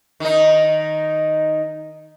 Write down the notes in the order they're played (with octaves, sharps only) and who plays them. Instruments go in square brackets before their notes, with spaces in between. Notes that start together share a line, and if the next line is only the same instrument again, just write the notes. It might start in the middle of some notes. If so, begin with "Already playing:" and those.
[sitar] D#3 D#4